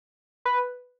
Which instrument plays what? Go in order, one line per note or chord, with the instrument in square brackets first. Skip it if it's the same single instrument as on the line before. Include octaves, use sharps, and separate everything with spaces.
[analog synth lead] B4